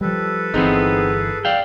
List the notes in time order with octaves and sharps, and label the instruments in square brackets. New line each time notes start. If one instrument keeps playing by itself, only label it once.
[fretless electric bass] F3 G3 [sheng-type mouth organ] A4 B4
[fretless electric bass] G1 E3 [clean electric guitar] B3 C4 D#4 [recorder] G#4
[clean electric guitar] D5 F5 G5